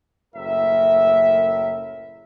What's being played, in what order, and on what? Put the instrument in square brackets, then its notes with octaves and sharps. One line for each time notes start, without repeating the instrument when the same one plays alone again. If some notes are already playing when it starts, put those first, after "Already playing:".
[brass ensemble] F#1 A2 A#4 E5